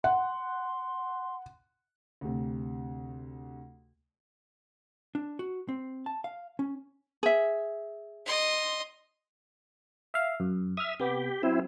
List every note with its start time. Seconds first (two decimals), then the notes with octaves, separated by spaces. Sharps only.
0.04 F#5 C6
2.21 D2 C3
5.15 D4
5.39 F#4
5.69 C4
6.06 A5
6.24 F5
6.59 C#4
7.23 G#4 E5
8.26 D#5 C6
10.14 E5 F5
10.40 F#2
10.77 E5 D#6 F6
11.00 C3 B3 G4
11.43 F#3 C4 E4